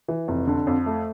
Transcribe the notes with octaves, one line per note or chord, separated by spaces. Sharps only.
E3
F1
D3
F2
A3